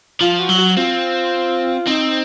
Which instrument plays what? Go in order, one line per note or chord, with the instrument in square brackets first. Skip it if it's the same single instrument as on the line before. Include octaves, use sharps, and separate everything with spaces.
[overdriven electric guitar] F3 [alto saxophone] F4
[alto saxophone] F#4
[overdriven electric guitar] F#3
[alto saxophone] F#4
[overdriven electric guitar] C4 [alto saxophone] F4
[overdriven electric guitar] C4 [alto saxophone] D#4